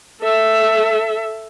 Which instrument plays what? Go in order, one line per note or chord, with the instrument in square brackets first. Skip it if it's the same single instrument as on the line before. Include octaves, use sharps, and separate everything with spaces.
[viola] A4 E5